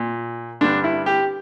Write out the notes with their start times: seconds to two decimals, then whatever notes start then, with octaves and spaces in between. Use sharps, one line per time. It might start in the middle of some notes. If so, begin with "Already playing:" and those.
Already playing: A#2
0.61 G2 D3 D4
0.84 E4
1.06 G4